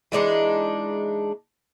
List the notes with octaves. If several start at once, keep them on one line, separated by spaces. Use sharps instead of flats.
E3 G#3 D4 D#4